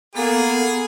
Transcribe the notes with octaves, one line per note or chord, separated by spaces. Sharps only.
A#3 B3 G#4 A4 F#5